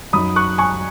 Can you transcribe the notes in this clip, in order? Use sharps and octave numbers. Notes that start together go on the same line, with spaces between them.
F#2 F#3 D#4 B5 D#6
C#6 F#6
G#5 C#6